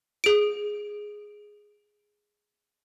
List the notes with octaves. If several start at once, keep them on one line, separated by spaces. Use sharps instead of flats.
G#4 D7